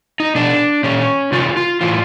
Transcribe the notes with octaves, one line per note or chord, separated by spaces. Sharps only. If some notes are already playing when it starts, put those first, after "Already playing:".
D#4
B2 D4
A#2 C#4
C3 D#3 F4
F4
A2 E3 F4